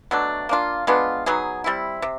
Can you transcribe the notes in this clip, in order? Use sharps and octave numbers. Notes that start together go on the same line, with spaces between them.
B2 F#3 A3 D4
A#3 D4 F4
G#3 B3 D4 F4
F#3 B3 D#4 G#4
G3 C4 E4
C3